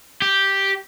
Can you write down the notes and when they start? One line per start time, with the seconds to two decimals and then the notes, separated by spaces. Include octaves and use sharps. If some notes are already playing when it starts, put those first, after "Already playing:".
0.22 G4